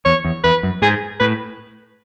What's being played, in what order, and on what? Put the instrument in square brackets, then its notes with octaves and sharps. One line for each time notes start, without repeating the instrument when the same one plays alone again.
[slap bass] E2 [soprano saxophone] C#5
[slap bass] E2
[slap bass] E2 [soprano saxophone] B4
[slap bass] F#2
[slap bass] G#2 [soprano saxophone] G#4
[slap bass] A2 [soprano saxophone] B4